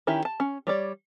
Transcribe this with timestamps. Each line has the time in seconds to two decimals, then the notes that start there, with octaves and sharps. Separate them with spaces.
0.07 D#3 C#4 E4 G4
0.25 A5
0.40 C#4
0.67 G3 C#5 D5